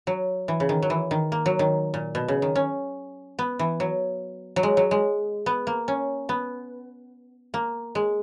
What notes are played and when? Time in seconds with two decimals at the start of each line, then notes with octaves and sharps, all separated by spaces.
0.07 F#3
0.48 E3
0.60 C#3
0.69 D#3
0.82 F#3
0.90 E3
1.11 D#3
1.32 A#3
1.46 F#3
1.59 D#3
1.94 A#2
2.15 B2
2.28 C#3
2.42 D#3
2.56 C#4
3.39 B3
3.59 E3
3.80 F#3
4.56 F#3
4.63 G#3
4.77 F#3
4.91 G#3
5.46 B3
5.67 A#3
5.88 C#4
6.29 B3
7.54 A#3
7.95 G#3